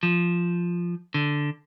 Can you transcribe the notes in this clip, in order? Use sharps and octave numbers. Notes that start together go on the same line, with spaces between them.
F3
D3